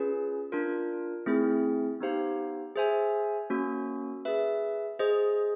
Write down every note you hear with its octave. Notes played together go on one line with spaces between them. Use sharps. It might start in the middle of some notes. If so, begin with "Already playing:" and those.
Already playing: C#4 F4 G#4 B4
D4 F4 A#4
A3 C4 E4 G#4
B3 D#4 G4 C5 F5
G#4 C5 E5 G#5
A#3 C#4 F#4
G#4 B4 E5
G#4 C5 D#5